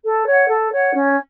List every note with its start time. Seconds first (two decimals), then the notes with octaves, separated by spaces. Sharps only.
0.03 A4
0.25 C#5 F#5
0.47 A4
0.71 C#5 F#5
0.93 C#4